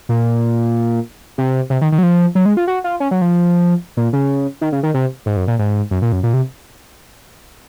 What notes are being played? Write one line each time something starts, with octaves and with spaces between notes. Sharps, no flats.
A#2
C3
C3
D#3
D#3
F#3
F3
F#3
G#3
F4
F#4
F4
C#4
F#3
F3
A#2
C#3
D#3
C#3
D#3
C3
G#2
F#2
A#2
G#2
F#2
A#2
F#2
A#2
C3